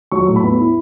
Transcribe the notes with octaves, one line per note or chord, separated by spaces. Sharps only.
F#3 C#6
A2
B5
B3
E4